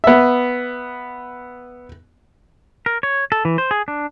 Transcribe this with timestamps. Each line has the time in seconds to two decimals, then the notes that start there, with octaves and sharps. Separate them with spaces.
0.04 B3 E5
2.86 A#4
3.03 C#5
3.32 A4
3.45 E3
3.58 C5
3.71 G#4
3.88 D4